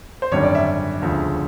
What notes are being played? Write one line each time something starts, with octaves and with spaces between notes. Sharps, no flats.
C5
G#1 F#2 D3 G3 C#5
D5
E5
E1 D2 C#3 F3